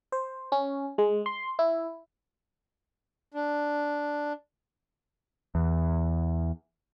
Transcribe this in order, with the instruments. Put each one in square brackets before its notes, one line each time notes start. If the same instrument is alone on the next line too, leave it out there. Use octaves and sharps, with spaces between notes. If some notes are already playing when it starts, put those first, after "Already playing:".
[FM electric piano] C5
C#4
G#3
C6
E4
[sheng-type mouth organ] D4
[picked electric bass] E2